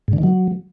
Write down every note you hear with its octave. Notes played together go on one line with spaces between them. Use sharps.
G#2
D3
D#3
F#3